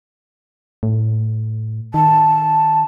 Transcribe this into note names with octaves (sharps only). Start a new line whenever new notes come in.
A2
D#3 A5